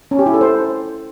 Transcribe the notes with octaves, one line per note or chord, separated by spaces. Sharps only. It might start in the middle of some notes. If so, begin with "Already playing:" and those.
C#4
G4
E4
A4
C5